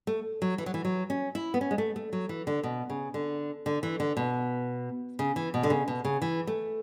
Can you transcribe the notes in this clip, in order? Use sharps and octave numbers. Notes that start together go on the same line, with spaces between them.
A3
F#3
E3
F#3
E3
F#3
C#4
E4
B3
C#4
G#3
A3
A3
F#3
E3
D3
B2
C#3
D3
D3
E3
D3
B2
C#3
E3
B2
D3
C#3
B2
C#3
E3
A3